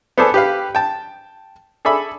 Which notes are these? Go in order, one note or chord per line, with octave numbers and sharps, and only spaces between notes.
B3 A4 C5 D5 G#5 A5
G4 B4 F5
G5 A5
G#4 A4 D5 E5 B5